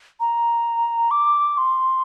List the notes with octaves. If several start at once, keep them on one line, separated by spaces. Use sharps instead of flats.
A#5
D6
C6